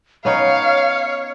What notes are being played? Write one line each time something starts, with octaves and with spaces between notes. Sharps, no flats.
B3 C#4 D#4 C#5 F5